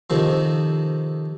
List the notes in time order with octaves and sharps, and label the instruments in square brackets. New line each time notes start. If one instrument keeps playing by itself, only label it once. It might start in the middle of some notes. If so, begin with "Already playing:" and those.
[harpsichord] F2 C3 D#3 F3